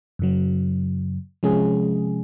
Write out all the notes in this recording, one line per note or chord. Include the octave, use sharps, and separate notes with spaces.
F#2 C#3 F#3
C3 F3 G#3 C#4 G#4